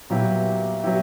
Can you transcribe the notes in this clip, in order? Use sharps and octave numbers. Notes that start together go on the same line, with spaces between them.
A#2 F#3 B3 E4 G4
F#3 B3 E4 G4